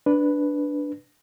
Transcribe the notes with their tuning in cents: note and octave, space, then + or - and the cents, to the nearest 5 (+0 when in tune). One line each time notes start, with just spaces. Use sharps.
D4 -5 B4 +0